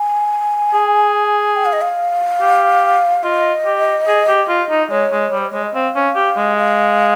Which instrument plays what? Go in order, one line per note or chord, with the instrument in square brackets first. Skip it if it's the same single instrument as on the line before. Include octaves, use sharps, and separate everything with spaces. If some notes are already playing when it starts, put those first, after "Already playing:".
Already playing: [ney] G#5
[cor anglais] G#4
[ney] G5
F5
D#5
F5
[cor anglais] G4
[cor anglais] F4 [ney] D#5
[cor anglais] G4
G#4
G4
F4
D#4
[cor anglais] G#3 [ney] C#5
[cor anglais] G#3
G3
[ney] C5
[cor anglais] G#3 [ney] C#5
[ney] D#5
[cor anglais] C4 [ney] F5
[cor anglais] C#4
G4
G#3
[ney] F5